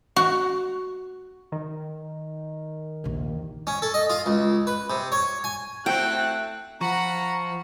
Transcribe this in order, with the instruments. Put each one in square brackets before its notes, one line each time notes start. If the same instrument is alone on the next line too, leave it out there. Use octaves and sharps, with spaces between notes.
[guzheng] F#4
[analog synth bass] D#3
[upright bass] A#1 D#2
[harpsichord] C#4
A4
D#5
F4
C#2
B4
C3
C#5
G#5
[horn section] A3 [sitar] C4 E4 F#4 [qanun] G5 [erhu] F#6
[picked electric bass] F3 [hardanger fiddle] F#5 B5 [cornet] A#5 [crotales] C#6